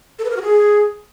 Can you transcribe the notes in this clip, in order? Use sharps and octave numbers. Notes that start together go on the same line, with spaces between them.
A4
B4
A#4
F#4
G#4